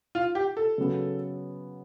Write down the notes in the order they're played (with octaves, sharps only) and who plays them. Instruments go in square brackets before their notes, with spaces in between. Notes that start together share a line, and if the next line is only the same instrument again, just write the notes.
[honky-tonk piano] F4
G4
A4
[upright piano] C#3 F#3 B3